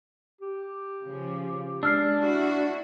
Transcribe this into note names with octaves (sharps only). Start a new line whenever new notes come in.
G4
C#3 F3
G#3 D4 E6 F6 C7
E4 F#4